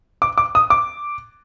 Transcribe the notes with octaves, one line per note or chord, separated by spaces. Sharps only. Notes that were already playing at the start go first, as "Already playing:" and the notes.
D6
D6
D#6
D6